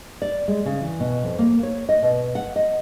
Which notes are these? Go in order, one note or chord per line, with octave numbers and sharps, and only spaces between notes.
D5
G#3
C#3
E3
B2
F2
A#3
C#5
D#5
B2
F#5
D#5